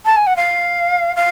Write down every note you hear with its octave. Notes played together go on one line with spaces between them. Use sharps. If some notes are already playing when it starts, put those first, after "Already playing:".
A5
G#5
F#5
F5
F5